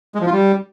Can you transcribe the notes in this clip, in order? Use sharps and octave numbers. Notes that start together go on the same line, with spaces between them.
G#3
F3
F4
G3